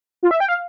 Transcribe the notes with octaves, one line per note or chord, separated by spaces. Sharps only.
F4
E5
G5
F5